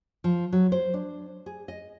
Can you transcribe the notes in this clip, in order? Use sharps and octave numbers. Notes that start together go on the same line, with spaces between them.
F3
F#3
C5
D4
G#4
D#5